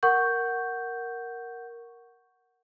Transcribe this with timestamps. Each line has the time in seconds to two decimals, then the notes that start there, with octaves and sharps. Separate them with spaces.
0.03 A#4 F#5 C#6 G6